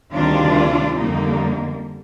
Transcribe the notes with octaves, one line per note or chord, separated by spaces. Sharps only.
D2 C3 D#3 G3 D4 F4
F2 D3 G3 A#3 D#4